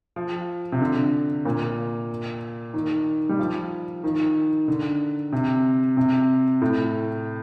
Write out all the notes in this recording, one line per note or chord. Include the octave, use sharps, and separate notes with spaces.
F3
C3
D3
A#2
D#3
G3
F3
D#3
D3
C3
C3
A2